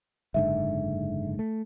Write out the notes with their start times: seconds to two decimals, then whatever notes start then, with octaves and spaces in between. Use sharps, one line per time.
0.34 F#1 G#2 D3 E5
1.39 A3